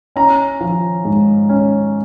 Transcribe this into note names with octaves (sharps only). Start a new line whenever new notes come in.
C#4 A#5
F3
G#2
C#4